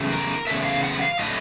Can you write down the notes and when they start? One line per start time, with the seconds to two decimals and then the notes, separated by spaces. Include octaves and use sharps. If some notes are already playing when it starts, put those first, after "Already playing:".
Already playing: E2 C#3 F#3 A3
0.11 A#4
0.47 E2 C#3 F#3 A3 E5
0.65 F5
0.83 F#5
1.01 F5
1.19 A2 F#3 A3 D#5